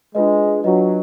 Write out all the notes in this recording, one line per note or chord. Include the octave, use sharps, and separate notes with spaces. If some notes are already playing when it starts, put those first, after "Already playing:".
G#3 D4 F4 B4 D#5
F#3 D4 F4 B4 D#5